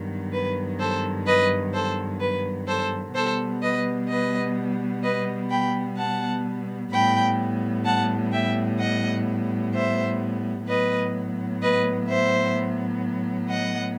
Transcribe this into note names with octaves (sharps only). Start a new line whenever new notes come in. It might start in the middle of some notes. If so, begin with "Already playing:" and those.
Already playing: G2 D#3 F#3 B3
B4
A4 C5
B4 D#5
A4 C5
B4
A4 C5
B2 G3 B3 A4 C5
B4 D#5
B4 D#5
B4 D#5
G5 B5
F#5 A5
A2 G3 B3 G5 B5
F#5 A5
E5 G5
D#5 F#5
C5 E5
A2 F#3 B3 B4 D#5
B4 D#5
C5 E5
D#5 F#5